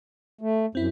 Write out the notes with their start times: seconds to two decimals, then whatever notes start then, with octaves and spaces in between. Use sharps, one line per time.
0.41 A3
0.75 F#2 C4 E4